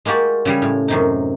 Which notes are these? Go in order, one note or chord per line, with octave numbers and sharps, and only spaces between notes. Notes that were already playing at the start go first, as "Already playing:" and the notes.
G#3 A#3 F#4 G4 D5
C#3 G3 G#4
A2
F#2 C3 D#4